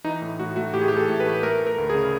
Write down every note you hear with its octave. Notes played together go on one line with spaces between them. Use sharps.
E3 D#4
A2
A2 F#4
A3 F#4
A2 G4
G#4
G4
E3
A4
A2
B4
A3
A3 A#4
A3
A#4
D2
G#4
C#3